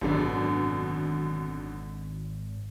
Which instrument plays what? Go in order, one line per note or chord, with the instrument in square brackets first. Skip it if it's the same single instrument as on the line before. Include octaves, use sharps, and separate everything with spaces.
[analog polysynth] G#1 [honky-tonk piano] F#2 B2 D3